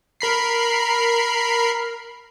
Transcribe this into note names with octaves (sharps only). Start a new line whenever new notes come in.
A#4 B5 C7